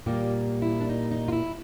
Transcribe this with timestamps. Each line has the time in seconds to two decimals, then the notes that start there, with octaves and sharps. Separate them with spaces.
0.06 A#2 G3 A#3 G4
0.62 E4
0.80 D4
0.89 D#4
1.11 D#4
1.28 F4
1.32 E4